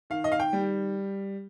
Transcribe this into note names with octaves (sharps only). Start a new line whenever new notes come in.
D#3 F5
D#5
F5
G5
G3